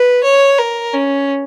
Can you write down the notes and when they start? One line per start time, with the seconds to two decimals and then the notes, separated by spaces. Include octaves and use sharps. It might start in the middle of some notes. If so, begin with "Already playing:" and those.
Already playing: B4
0.24 C#5
0.59 A#4
0.93 C#4